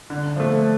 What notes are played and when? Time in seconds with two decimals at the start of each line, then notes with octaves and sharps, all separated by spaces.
0.10 D3
0.36 F3 A3